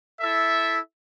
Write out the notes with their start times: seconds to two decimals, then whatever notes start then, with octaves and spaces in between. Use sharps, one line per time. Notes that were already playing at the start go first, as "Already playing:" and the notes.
0.20 E4 A4 E5